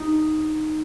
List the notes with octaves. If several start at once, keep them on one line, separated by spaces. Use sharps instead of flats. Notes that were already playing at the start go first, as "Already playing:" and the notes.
Already playing: D#4